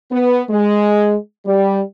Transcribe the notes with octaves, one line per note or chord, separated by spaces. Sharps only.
B3
G#3
G3